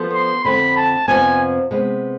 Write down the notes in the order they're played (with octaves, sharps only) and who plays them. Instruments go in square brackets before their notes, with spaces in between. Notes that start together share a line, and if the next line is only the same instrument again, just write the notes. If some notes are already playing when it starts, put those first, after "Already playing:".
Already playing: [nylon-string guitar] F3 B3 D4 A4 C5
[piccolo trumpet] C6
[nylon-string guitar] F2 D3 A3 C4 [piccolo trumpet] B5
[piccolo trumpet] A5
[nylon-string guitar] F2 C3 F3 B3 D4 [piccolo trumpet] G#5
[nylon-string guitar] C3 G#3 B3